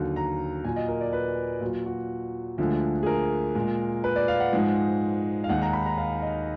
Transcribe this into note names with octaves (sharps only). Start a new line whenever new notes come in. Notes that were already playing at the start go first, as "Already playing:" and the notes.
Already playing: D#2 D3 F#3
A#5
A#2 F#3 G#5
D#5
A#4
D5
B4
A#2 F#3
F#4
D2 D3 F3 G#3
G#4
A#4
A#2 G#3
B4
D5
F5
F#5
G#2 F3 G#3
F5
D#2 D#3 G#3 F#5
A#5
B5
A#5
F5
D#5